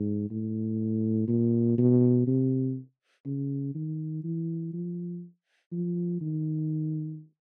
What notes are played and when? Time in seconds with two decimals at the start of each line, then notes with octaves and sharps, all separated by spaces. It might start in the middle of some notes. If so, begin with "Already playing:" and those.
Already playing: G#2
0.31 A2
1.28 A#2
1.78 B2
2.27 C3
3.26 C#3
3.75 D#3
4.24 E3
4.74 F3
5.72 F3
6.21 D#3